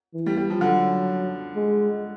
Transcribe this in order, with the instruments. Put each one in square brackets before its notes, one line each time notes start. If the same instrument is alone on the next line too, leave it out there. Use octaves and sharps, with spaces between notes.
[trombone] E3
[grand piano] G3
G3
F3
[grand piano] D3 [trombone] F#3
[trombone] G#3